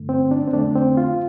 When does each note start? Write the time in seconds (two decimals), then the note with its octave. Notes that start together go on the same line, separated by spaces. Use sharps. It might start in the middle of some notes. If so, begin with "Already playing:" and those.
Already playing: G2 D3 A3
0.09 C4
0.31 D4
0.47 C4
0.53 F2 D3 A3 D4
0.76 C4
0.97 F4